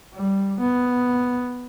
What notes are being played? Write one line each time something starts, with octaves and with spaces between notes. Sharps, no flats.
G3
B3